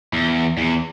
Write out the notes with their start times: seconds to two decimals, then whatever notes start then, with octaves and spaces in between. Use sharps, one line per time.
0.13 E2
0.58 E2